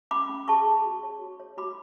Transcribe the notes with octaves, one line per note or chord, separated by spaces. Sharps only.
C#4 B5 D6
C#4
G#4 A5 C#6
G#4
F#4
C#5
F#4
C#5
F#4 B5 D6